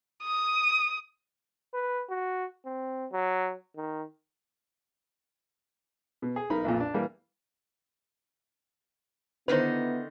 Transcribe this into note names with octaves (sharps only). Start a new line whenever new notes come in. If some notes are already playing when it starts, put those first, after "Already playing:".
D#6
B4
F#4
C4
F#3
D#3
B2
G#4
B1 D#4 A#4 B5
B1 F2 A#2
D4
E3 G3 A#3
D3 D#3 B3 D#4 E4 B4 C5